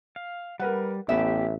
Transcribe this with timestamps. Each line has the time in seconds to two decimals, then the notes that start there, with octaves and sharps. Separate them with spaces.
0.16 F5
0.60 G3 A#4 B4 F#5
1.09 A1 B3 G4 E5